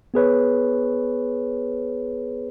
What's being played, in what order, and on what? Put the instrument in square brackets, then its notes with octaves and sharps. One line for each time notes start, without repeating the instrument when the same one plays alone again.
[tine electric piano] B3 G#4 B4 C#5